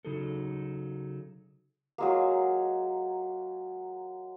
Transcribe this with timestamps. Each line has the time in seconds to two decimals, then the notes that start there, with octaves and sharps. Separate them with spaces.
0.05 C#3 F#3 D#4 F#4 G#4 A4
1.98 F#3 G#3 A#3